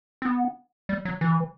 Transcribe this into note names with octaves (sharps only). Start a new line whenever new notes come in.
C4
B3
G3
F#3
E3